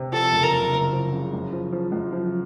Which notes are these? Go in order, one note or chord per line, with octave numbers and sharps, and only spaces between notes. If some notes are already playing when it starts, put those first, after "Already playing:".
Already playing: C3
F3 A4
F#1
A#4
F#1
F#1
F3
C#3
F#2
F3
F3
F#2
F3